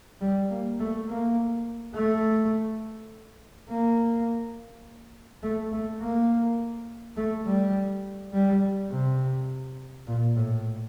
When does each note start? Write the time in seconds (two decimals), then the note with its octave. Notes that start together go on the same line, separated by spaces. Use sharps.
0.21 G3
0.50 A#3
0.79 A3
1.08 A#3
1.95 A3
3.69 A#3
5.43 A3
5.72 A3
6.01 A#3
7.17 A3
7.46 G3
8.33 G3
8.91 C3
10.07 A#2
10.36 A2